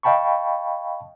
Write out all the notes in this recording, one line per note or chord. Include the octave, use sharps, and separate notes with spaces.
D#5 F5 G5 A5 B5 C#6